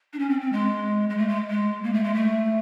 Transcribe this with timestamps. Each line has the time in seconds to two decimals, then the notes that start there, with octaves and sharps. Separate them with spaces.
0.13 D4
0.19 C#4
0.29 C4
0.41 C4
0.52 G#3
1.10 G#3
1.18 A3
1.29 G#3
1.50 G#3
1.84 A#3
1.93 A3
2.04 G#3
2.14 A3